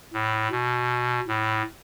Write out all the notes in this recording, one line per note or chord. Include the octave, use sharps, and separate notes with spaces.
A2
B2
A2